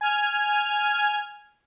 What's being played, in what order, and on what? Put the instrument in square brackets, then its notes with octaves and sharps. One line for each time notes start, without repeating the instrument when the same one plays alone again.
[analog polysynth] G#5 F6 G#6